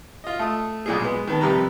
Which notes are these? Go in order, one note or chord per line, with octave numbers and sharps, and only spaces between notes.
F4 D#5
A3 D#6
B1 A#2 G#4
G#3 B3
D#3 B3 A5
F2 C3 G3 B4 A#5